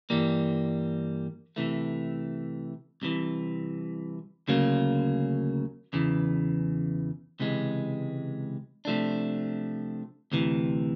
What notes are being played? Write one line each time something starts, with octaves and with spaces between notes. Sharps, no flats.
G2 E3 G3 A#3
C3 E3 A3
C2 C3 E3
D2 C#3 F#3 A#3
E2 C#3 E3
C#2 C3 E3 G#3
C3 F3 A3 D4
D2 C3 E3